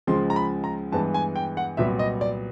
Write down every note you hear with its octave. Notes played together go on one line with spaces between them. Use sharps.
C#2 C#3 F3 G#3 C6
A#5
B5
A#5
G2 E3 G#3 B3 A5
G#5
G5
F#5
C2 A#2 F#3 B3 E5
D#5
D5